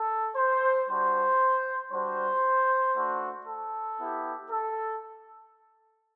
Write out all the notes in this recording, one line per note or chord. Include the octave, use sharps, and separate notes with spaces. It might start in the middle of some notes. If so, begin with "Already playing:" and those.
Already playing: A4
C5
G3 D4 F#4 C5
G3 D4 F#4 C5
A3 D4 F#4
A4
B3 E4 G4
A4